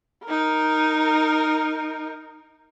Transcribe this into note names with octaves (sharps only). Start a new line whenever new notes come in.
D#4 A#4